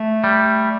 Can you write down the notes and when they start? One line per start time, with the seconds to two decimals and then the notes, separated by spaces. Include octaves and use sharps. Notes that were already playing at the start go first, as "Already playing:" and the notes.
Already playing: A3
0.24 G3